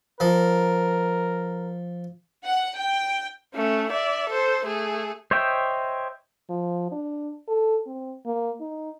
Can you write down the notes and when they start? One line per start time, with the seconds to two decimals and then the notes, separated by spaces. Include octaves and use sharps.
0.20 F3 A#4
2.45 F#5
2.78 G5
3.54 A3 C#4
3.90 D5 E5
4.29 A4 C5
4.65 A3 G#4
5.31 C5 C#5 D#5 E5 G5
6.50 F3
6.92 D4
7.48 A4
7.87 C4
8.26 A#3
8.61 D#4